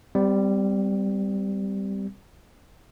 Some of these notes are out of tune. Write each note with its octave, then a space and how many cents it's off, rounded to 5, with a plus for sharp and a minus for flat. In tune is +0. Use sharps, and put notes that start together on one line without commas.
G3 +0 C4 -35